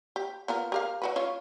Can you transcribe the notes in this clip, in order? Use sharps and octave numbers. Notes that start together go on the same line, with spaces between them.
G4
B3 F4 A#4
G4 A#4 F5
F#3 F#4 B4
C#4 F4 C#5